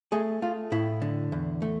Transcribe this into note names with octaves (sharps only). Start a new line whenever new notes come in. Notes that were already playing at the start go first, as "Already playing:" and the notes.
A3 G#4
A3 F4
A2 E4
D3
E2
A3